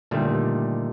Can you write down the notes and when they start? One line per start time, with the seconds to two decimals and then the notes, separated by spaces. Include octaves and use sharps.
0.11 A#2 D3 D#3 G3 A3